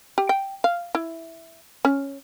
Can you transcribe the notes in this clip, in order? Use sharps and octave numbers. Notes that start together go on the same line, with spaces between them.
G4
G5
F5
E4
C#4